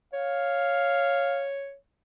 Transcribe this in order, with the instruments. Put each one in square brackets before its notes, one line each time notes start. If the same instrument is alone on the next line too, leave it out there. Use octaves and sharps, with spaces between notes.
[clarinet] C#5 [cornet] F5